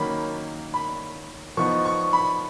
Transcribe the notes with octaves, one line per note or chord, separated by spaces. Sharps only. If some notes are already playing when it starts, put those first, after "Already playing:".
Already playing: D#3 F#3 A#3 C#4 B5
B5
F3 B3 D#4 C#6
C#6
B5